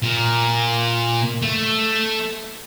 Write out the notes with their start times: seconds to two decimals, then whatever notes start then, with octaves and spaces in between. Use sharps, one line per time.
0.03 A#2
1.42 A3